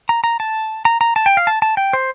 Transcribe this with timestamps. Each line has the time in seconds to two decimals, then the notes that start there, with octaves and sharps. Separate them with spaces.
0.09 A#5
0.24 A#5
0.40 A5
0.85 A#5
1.01 A#5
1.16 A5
1.26 G5
1.37 F5
1.47 A5
1.62 A5
1.77 G5
1.93 C5